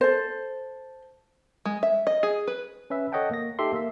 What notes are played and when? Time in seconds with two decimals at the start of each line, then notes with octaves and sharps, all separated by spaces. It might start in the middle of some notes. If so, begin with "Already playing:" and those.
0.01 A4 C5
1.65 G#3
1.83 E5
2.07 D#5
2.23 G#4
2.47 B4
2.90 C#4 B4 E5
3.12 A4 C#5 D#5 F#5 G5 A5
3.31 A#3 A#6
3.59 D#4 G4 A4 E5 C6
3.72 A#3 E5